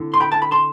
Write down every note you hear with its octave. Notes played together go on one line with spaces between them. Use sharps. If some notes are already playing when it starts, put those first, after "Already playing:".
Already playing: D3 C4 E4
C6
G5 B5
A5
B5
A5 C6